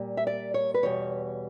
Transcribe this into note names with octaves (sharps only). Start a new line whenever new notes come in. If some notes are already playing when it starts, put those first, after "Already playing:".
Already playing: A#2 G3
E5
D5
C#5
B4
E2 B2 G3 C#5